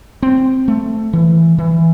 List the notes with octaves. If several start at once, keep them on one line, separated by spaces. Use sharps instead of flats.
C4
A3
E3
E3